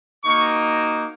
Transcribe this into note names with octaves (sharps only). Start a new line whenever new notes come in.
A#3 D#4 F#4 C#6